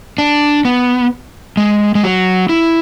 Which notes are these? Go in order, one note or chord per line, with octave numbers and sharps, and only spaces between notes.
D4
B3
G#3
G#3
F#3
E4